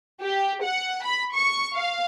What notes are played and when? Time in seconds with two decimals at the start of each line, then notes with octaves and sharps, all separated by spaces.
0.21 G4
0.62 F#5
1.04 B5
1.35 C#6
1.75 F5